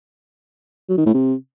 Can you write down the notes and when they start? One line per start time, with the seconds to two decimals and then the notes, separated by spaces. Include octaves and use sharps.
0.89 F#3
0.98 D#3
1.06 A2
1.14 C3